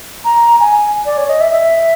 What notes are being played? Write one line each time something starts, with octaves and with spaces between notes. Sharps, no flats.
A#5
G#5
D5
C#5
D#5
E5
E5